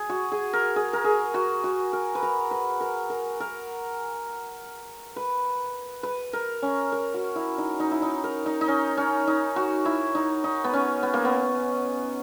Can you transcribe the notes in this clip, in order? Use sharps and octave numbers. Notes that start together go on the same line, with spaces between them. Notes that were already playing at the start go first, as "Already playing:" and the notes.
Already playing: G#4
F#4
G#4
A#4
G#4
A#4
G#4
F#4
F#4
A#4
B4
A#4
B4
A#4
A#4
A#4
B4
B4
A#4
C#4
A#4
F#4
E4
D#4
D#4
E4
D#4
A#4
D#4
D#4
C#4
C#4
D#4
F#4
E4
D#4
D#4
B3
C#4
B3
A#3
B3